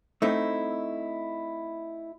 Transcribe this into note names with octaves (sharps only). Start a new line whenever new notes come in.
A3 C4 D#4 E4